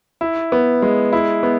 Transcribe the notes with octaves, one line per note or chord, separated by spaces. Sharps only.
E4
B3
G#3
E4
B3